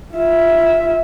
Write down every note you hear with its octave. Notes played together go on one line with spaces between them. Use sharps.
F4 E5